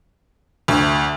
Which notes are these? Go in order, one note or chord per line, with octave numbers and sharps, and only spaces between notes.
D2